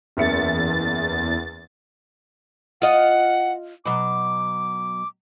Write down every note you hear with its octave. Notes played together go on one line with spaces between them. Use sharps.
F#1 E2 E5 A6 C#7
F4 D#5 F#5
B2 F#3 D6